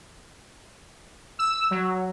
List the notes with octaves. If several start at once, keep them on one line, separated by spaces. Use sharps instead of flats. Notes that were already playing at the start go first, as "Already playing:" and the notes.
E6
F#3